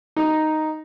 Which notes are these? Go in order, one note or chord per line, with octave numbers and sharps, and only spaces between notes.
D#4